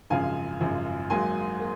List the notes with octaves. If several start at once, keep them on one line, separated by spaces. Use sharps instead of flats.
G#1 F#2 C#3 F3 F5 G#5
G#1 F#2 C#3 F3
G#1 G#2 F#3 A#3 G#5 C6
A#3